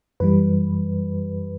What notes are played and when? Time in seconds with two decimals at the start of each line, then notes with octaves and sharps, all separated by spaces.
0.20 F#2 E3 G3 B4